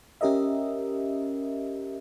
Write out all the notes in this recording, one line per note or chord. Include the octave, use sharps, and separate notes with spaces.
C#4 G4 A#4 D#5 E5